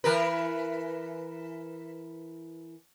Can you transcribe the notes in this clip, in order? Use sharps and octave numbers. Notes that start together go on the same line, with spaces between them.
E3 A#4 B4